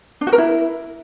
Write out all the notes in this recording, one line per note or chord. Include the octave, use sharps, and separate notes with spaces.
D4
F#4
A#4
E4